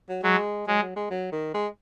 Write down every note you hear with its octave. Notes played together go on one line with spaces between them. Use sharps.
F#3
F#3 G#3
F#3 G#3
F#3
G#3
F#3
D#3
G#3